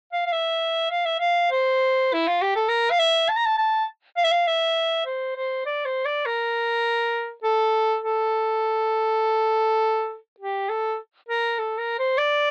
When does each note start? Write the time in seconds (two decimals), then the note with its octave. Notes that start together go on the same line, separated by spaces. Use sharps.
0.12 F5
0.26 F5
0.32 E5
0.91 F5
1.05 E5
1.20 F5
1.51 C5
2.14 E4
2.28 F4
2.42 G4
2.56 A4
2.69 A#4
2.91 F5
2.99 E5
3.29 A5
3.37 A#5
3.45 A5
3.58 A5
4.17 F5
4.24 E5
4.31 F5
4.48 E5
5.06 C5
5.36 C5
5.66 D5
5.85 C5
6.06 D5
6.26 A#4
7.43 A4
8.03 A4
10.40 G4
10.69 A4
11.29 A#4
11.58 A4
11.78 A#4
11.99 C5
12.18 D5